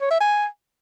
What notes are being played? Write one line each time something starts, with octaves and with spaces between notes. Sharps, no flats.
C#5
E5
G#5